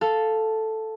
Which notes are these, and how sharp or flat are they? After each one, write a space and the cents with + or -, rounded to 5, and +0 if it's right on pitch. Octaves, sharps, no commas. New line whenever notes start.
A4 +0 F5 +0